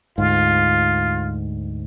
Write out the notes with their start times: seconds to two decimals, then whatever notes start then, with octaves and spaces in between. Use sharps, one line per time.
0.18 D2 G#2 F4